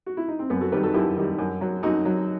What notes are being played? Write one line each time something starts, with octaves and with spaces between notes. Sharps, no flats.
F#4
E4
D#4
C4
F#2 B3
F#4 A4
D#3 G3 G4 B4
F#4 A4
F#2 E4 G4
D#3 G3
F#2
F#3
F#2 D#4 F#4
F#3